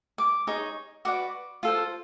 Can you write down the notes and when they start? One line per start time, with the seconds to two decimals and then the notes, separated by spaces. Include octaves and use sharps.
0.18 D6
0.47 D#4 G#4 C#5
1.05 F#4 B4 D5 D6
1.63 F4 A4 C5